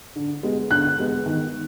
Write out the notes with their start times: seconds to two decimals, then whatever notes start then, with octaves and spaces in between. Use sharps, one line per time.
0.16 D3
0.43 G#3 B3
0.71 D3 F#6
0.99 G#3 B3
1.26 D#3